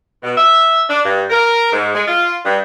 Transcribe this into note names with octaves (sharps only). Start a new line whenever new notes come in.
B2
E5
D4
G2
A#4
G#2
G#3
F4
G2